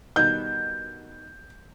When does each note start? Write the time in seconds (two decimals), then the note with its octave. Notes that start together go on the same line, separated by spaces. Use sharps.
0.16 B2 D#3 G3 G6